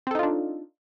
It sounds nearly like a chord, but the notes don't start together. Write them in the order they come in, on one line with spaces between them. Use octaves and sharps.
C4 A4 D#4 F4 D4